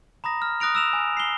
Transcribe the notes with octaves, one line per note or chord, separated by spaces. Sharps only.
A#5 B5 D#6 A#6
F6
D#6 F#6 A#6 D7 F7
E6 E7 F7
G#5
C7 G7